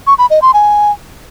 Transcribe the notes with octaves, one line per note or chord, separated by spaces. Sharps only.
C#6
B5
D#5
C6
G#5